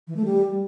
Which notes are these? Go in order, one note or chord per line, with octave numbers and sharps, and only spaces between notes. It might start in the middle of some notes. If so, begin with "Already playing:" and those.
E3
A3
G3